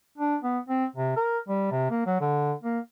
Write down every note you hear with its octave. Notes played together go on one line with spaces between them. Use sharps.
D4
B3
C4
C3
A#4
G3
C3
A#3
F#3
D3
A#3